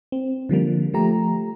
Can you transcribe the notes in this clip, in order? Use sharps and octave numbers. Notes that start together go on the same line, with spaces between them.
C4
D3 F3 G3 A#3
F3 A3 G4 A#5